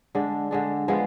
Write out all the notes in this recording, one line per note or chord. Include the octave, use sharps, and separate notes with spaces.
D3 G#3 D4
D3 G#3 D4
F3 G#3 B3 F4